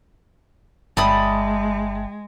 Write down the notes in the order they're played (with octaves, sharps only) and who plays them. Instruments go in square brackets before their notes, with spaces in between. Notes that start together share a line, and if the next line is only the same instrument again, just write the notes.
[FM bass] G1 [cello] G#3 [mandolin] D5 B5 D#6 [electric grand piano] E5 G5 A5